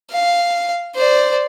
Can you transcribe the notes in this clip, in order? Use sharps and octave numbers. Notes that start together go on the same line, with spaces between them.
F5
C5 D5